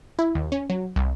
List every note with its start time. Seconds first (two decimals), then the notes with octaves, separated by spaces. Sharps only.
0.19 E4
0.35 D#2
0.52 C#4
0.70 F#3
0.96 C2